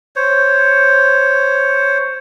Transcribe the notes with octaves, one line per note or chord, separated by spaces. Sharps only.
C5 C#5